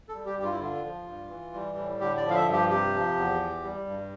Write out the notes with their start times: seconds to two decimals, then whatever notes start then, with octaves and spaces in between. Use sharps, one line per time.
0.09 A4
0.14 G3
0.26 G4
0.37 G2 G4
0.43 F4
0.51 E4
0.60 D3 F4
0.84 F3
1.07 G2
1.30 E3
1.54 G3
1.76 A2
2.00 D3 G4
2.17 D5
2.23 F3
2.30 F5
2.35 E5
2.46 G2
2.52 G4
2.70 C3 G4
2.94 F3
3.16 E2
3.40 E3
3.63 G3
3.86 G2